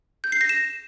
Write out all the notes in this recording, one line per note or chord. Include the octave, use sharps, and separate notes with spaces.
G6
C7
A#6
E7